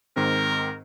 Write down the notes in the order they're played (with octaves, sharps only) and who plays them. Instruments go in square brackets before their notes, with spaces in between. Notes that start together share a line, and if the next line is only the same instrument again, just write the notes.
[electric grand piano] G#2 D#3 C4 [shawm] A#4